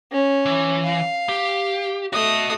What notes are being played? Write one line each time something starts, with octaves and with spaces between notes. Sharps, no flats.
C#4
E3
F5
G4
A3 F#4 D#5 D#6